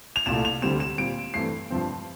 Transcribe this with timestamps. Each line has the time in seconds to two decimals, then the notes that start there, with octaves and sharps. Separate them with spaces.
0.16 F7
0.26 C2 A#2 A3 E7
0.45 F7
0.62 D2 D3 G3 C4 E7
0.80 E7
0.98 A#2 G3 C4 D7
1.34 G2 E3 A3 C4 C7
1.70 G2 F3 C4